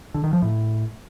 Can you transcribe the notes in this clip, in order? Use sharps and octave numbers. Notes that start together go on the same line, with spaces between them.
D3
D#3
F3
A2